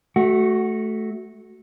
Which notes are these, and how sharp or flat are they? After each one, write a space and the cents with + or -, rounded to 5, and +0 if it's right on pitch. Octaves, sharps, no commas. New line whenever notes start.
A3 -10 F#4 +10